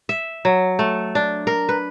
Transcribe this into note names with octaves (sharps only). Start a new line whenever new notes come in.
E5
F#3
A3
D4
A#4
B4